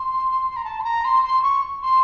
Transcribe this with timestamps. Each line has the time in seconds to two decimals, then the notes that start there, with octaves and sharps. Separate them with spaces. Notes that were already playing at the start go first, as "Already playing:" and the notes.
Already playing: C6
0.56 A#5
0.65 A5
0.80 C6
0.84 A#5
1.05 C6
1.24 C6
1.43 C#6
1.83 C6